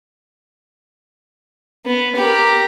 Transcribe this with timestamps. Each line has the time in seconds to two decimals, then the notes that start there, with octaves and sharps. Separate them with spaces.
1.86 B3
2.16 G4 A#4